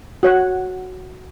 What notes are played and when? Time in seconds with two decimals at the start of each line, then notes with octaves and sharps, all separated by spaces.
0.23 F#4 C#5 F#5